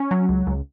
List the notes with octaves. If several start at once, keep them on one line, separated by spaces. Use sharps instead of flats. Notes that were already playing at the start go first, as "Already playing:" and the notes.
Already playing: C#4
F#3
C#2
C#2